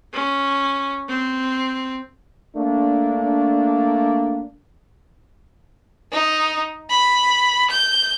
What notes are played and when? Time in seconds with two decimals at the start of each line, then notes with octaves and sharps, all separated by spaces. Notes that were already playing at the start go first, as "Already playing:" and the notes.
0.13 C#4
1.08 C4
2.56 A3 A#3 D4
6.12 D#4
6.90 B5
7.70 G6